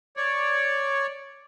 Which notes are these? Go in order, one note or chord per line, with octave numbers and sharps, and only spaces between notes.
C#5 D5